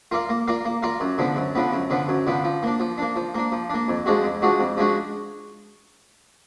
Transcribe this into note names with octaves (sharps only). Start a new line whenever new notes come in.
F4 A#4 D5 F5
A#3
F4 A#4 D5 F5
A#3
F4 A#4 D5 F5
F#2
D3 F3 B3
F#2
D3 F3 B3
F#2
D3 F3 B3
F#2
D3 F3 B3
F3
A#3 D4
F3
A#3 D4
F3
A#3 D4
F3
A#3 D4
F2
F3 G#3 D4 F#4
F2
F3 G#3 D4 F#4
F2
F3 G#3 D4 F#4